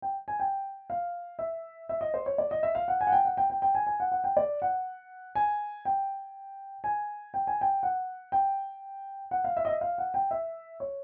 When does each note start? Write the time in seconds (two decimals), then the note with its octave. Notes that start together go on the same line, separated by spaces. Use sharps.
0.02 G5
0.28 G#5
0.40 G5
0.90 F5
1.39 E5
1.89 E5
2.01 D#5
2.14 C5
2.26 C#5
2.38 D5
2.51 D#5
2.63 E5
2.75 F5
2.88 F#5
3.01 G#5
3.07 F#5
3.12 G5
3.25 F#5
3.37 G5
3.50 G5
3.62 G5
3.75 G#5
3.87 G#5
4.00 F#5
4.12 F#5
4.24 G5
4.37 D5
4.62 F#5
5.35 G#5
5.85 G5
6.84 G#5
7.34 G5
7.47 G#5
7.61 G5
7.83 F#5
8.32 G5
9.31 F#5
9.44 F5
9.57 E5
9.65 D#5
9.69 E5
9.81 F5
9.98 F#5
10.14 G5
10.31 E5
10.80 C#5